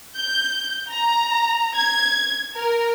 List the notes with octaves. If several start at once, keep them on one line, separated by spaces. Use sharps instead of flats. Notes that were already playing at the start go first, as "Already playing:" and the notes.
G6
A#5
G#6
A#4